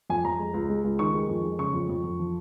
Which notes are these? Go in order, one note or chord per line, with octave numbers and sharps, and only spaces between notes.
F2 G#5
F2 A#5
G#3
C#2
G#3
C#2
D#3 C#6
G#3
F2
G#3
C#3 C#6
F2
F2
F2
F3